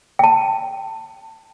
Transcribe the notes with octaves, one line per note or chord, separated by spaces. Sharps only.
G5 A5